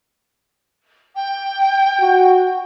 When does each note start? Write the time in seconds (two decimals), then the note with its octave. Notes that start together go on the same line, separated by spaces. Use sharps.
1.15 G5
2.01 F#4